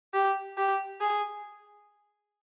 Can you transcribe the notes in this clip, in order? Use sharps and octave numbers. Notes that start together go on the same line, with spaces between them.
G4
G4
G#4